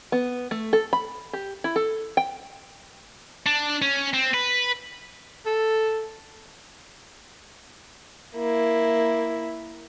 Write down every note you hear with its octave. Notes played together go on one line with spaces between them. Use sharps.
B3
A3
A4
B5
G4
E4
A4
G5
D4
C#4
C4
B4
A4
A#3 E4